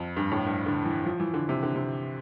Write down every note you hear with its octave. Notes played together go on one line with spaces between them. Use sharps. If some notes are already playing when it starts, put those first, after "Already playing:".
Already playing: F2
G2
A2
G2
D3
E3
F3
E3
D3
C3
D3
C3